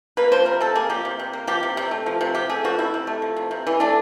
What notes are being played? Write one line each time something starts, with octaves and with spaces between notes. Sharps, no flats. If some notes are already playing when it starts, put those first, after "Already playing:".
A#3 B4
F3 C5
C3 A#4
C3 A4
A#3 G#4
F3 G4
C3
C3
A#3
F3 G4
C3
C3
A3
F3
C3
C3 G4
A3 G#4
F3 F#4
C3 E4
C3
A3
F3
C3
C3
E3
A3 D4